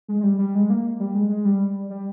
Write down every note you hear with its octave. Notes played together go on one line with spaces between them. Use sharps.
G#3
G#3
G3
G3
G#3
A#3
G3
G#3
G#3
G3
G3